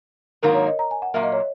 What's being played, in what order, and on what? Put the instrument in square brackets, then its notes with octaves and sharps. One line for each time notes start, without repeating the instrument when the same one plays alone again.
[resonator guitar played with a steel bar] G#2 D#3 F#3 A#3 [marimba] A#4
[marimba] C#5
D#5
A#5
G#5
F#5
[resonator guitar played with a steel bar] A#2 F#3 A#3 [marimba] E5
[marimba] D#5
C#5